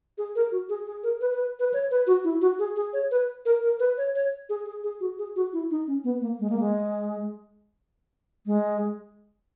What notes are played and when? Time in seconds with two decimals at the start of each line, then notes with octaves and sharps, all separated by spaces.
0.18 G#4
0.36 A#4
0.52 F#4
0.69 G#4
0.87 G#4
1.03 A#4
1.21 B4
1.34 B4
1.59 B4
1.73 C#5
1.91 B4
2.07 F#4
2.24 E4
2.41 F#4
2.59 G#4
2.76 G#4
2.93 C#5
3.11 B4
3.45 A#4
3.63 A#4
3.80 B4
3.98 C#5
4.15 C#5
4.49 G#4
4.66 G#4
4.84 G#4
5.00 F#4
5.18 G#4
5.36 F#4
5.53 E4
5.71 D#4
5.87 C#4
6.04 B3
6.21 A#3
6.40 G#3
6.50 A#3
6.60 G#3
8.46 G#3